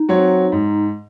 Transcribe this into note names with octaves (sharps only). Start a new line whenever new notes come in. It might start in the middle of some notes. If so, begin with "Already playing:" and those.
Already playing: D#4
F#3 C4 F#4 C#5
G#2